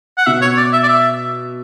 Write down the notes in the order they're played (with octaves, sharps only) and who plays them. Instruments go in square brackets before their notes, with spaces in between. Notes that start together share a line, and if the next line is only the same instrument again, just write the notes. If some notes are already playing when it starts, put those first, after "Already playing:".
[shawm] F#5
[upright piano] B2 [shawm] E5
[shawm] C#5
D5
E5
D5
E5